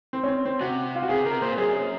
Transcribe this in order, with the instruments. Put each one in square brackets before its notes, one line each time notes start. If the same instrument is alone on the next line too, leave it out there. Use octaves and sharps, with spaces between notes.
[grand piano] C4
C#4
C4
C4
[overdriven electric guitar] C3 [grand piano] F#4
[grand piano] F4
F#4
[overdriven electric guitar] C3 [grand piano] G#4
[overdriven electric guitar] C3 [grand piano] A#4
[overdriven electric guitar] A#2 [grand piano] C5
[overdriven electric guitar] F#2 [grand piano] G#4
[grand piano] G#4